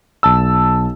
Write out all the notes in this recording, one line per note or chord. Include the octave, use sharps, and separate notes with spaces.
B1 A5 E6